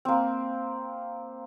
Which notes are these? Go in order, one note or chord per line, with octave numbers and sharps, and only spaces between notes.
A#3 C4